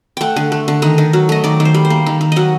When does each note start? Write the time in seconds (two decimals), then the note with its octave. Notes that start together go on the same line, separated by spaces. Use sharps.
0.17 A3 F#5 G5
0.36 D3
0.52 A3
0.68 D3
0.82 D#3 D#5
0.98 D#3
1.13 F#3
1.29 A3 D#5
1.44 D#3 D5
1.60 D#3
1.65 C5
1.74 G3
1.85 C5
1.90 A#3
2.06 D#3
2.21 D#3
2.32 F#3 D#5 F#5